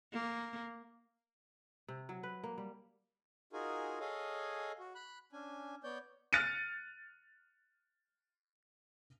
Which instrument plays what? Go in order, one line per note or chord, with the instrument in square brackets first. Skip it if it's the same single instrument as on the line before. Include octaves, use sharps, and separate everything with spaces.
[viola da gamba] A#3
[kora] C3
F#3
B4
A#3
G3
[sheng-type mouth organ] D#4 F4 F#4 G#4 A#4 G#5
G#4 A4 C#5 D#5 F5 G#5
F#4
B5 F#6
C#4 D4 G#5
B3 C#5 D5 G6
[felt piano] F6 F#6 A6 C#7 D#7